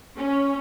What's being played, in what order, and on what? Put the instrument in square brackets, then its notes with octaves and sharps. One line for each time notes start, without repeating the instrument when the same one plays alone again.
[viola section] C#4